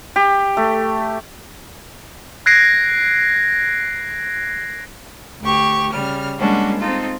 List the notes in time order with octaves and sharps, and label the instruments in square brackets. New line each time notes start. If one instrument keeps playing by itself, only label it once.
[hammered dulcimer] G4
A3
[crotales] F#6 G#6 A#6 C7 D7
[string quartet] D2 G4 C#6
C#3 G3 F6
G3 G#3 A#3 C#4 D4 F#4
C4 D#4 F4 A4